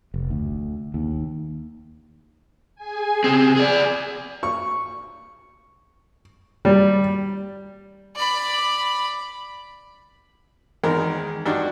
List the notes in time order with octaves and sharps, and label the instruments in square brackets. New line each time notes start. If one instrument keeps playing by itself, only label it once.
[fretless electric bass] F1
D2
D#2
[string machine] G#4 G#5
[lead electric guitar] C#3 C4
[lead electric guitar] G#4 D5 [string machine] G#5 D#6
[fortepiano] C#6
G3
[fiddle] D5 B5
[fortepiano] E2 D#3 G#3 A#4
G2 D4 D#4 F#4